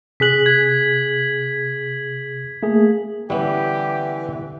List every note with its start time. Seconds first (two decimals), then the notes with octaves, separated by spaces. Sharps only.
0.20 C3 G#4 F#6 B6 F#7
0.46 G#6
2.63 A3 A#3 G#4
3.30 D3 E3 G3 B3 C#4 G4